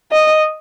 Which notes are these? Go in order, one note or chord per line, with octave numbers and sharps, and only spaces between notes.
D#5